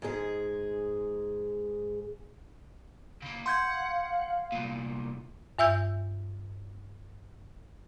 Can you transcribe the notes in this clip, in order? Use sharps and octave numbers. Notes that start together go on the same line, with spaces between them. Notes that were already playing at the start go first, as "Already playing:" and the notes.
G#2 G#3 G#4
C#3 A#3
F5 F#5 C6 G6 G#6
C2 A#2
G2 E5 E6 G6